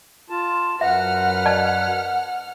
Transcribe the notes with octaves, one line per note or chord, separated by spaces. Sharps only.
F4 A5
F#2 B4 E5 F#5 F6
D5 D#5 A5